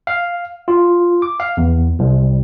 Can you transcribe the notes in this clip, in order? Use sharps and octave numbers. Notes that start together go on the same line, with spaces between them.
F5
F4
D6
F5
E2
C2